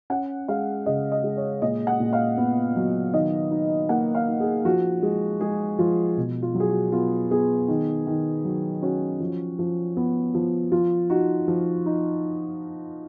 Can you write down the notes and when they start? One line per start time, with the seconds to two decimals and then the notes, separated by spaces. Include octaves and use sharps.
0.10 C#4 F#5
0.48 G#3 F5
0.86 C#3 D#5
1.12 D#5
1.24 G#3
1.37 C#5
1.62 A#2 D#5
1.87 F#5
2.00 A#2
2.13 F5
2.37 B3
2.76 F#3
3.13 D#3 D#5
3.51 D#4
3.89 A#3 F#5
4.15 F5
4.28 D#4
4.40 G#4
4.65 F3 F#4
5.03 G#3
5.41 G#3 G#4
5.79 F3 F4
6.17 B2
6.42 F4
6.55 F#3
6.60 G#4
6.68 F#4
6.92 B3 F4
7.31 B3 G#4
7.68 D#3
8.07 D#3
8.45 F#3
8.82 C#4 F#4
9.20 F3
9.59 F3
9.97 B3
10.34 F3
10.72 F3 F4
11.10 D#4 F#4
11.48 F3
11.86 D#4